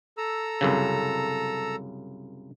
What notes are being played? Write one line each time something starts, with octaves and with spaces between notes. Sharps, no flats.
A4 A#5 E6
C2 F#2 C#3